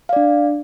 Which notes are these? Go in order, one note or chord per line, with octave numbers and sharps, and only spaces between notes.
D4 D5 F5